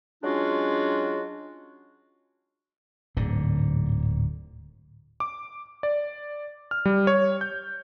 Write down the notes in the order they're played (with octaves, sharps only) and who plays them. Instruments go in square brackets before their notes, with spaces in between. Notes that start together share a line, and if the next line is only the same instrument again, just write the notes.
[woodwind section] F#3 G#3 C#4 D4 F4 F#4
[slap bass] D1 G#2 D3
[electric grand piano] D6
D5
F6
G3
C#5
G6